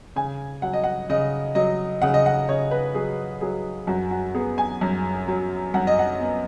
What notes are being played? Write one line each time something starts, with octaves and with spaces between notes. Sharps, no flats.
C#3 G#5
F#3 F#5
D#5
F#5
C#3 D#5
F#3 D#5
C#3 F#5
D#5
F#5
C#3 C#5
B4
F#3 G#4
F#3 G#4
F#2 F#4
F#4
B3 G#4
G#5
F#2
F#3
F#2 F#5
D#5
F#5
B3